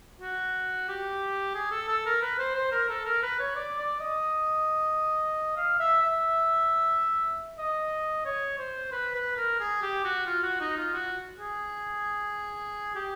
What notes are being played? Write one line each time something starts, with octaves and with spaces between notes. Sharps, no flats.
F#4
G4
G#4
A4
A4
A#4
B4
C5
C5
A#4
A4
A#4
B4
C#5
D5
D5
D#5
F5
E5
E5
D#5
C#5
C5
B4
B4
A#4
G#4
G4
F#4
F4
F#4
D#4
F4
F#4
G#4
G4